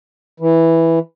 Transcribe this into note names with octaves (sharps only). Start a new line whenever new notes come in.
E3